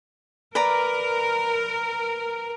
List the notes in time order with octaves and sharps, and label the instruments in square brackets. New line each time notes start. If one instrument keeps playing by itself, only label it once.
[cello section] A#4 [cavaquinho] B4 D5 A#5